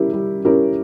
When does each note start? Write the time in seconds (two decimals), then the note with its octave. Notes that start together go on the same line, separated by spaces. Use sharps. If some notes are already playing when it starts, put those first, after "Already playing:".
Already playing: G3 C#4 E4 G4 A#4
0.13 G3
0.45 C#4 E4 G4 A#4